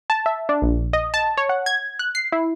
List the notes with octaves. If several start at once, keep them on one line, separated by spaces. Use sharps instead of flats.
A5
E5
D4
A#1
D#5
A5
C#5
F#5
G#6
F#6
C7
E4